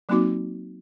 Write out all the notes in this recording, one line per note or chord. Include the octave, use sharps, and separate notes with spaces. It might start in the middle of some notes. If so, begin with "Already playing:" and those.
F#3 A#3 C4 D#4 F#4 D6